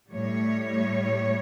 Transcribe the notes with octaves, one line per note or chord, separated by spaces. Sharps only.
A2 G3 C#5